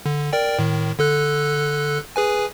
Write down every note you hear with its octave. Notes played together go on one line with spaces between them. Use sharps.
D3
A#4 D5 G5
A2 D#3
D3 A4 F#6
G#4 B4 G#5